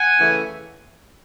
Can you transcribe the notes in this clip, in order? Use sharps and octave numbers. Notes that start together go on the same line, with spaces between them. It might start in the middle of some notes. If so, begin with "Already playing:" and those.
Already playing: F#5 G#5
C#3 E3 A3 C#4